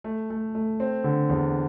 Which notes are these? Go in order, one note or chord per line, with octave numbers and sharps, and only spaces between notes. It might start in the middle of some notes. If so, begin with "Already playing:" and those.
A3
A3
A3
C4
D3
E2